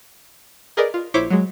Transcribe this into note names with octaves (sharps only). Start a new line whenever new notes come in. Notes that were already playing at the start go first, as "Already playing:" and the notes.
G#4 A#4 B4 D5 D#5
F4
A#1 E4 C5 C#5 D6 B6
F#3 G#3